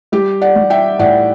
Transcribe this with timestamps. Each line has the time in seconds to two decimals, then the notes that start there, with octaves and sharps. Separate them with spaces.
0.12 G3 G4
0.41 D5 F#5
0.55 G3
0.70 E5 G5
0.99 A2 D5 F#5